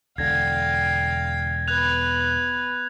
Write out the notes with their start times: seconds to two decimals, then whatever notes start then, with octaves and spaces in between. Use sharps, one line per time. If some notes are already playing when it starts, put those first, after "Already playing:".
0.18 E1 D3 F5 G5 G#6 A#6
1.68 B3 B4 F#6 G#6 F7